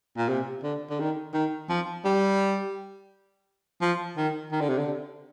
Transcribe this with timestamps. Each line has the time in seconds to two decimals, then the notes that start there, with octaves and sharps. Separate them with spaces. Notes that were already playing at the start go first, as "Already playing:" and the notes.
0.17 A#2
0.29 C3
0.63 D3
0.90 D3
1.00 D#3
1.34 D#3
1.69 F3
2.05 G3
3.81 F3
4.17 D#3
4.52 D#3
4.61 D3
4.69 C3
4.78 D3